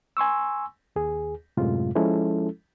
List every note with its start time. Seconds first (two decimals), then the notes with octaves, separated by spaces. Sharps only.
0.17 G#5 C6 C#6 E6
0.96 D#2 G#4
1.57 F#2 A2 C3 G#3 F4
1.95 F3 G#3 C#4 E4 A4